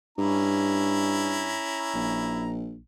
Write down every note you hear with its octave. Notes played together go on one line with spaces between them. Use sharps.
G2 C#4 E4 A#5
A#1